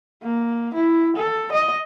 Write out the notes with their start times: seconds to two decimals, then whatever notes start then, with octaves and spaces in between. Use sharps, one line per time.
0.23 A#3
0.74 E4
1.16 A4
1.52 D#5